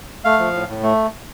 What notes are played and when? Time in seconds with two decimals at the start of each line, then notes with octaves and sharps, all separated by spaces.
0.25 A3 F5
0.39 F3
0.54 A2
0.68 A2
0.83 A3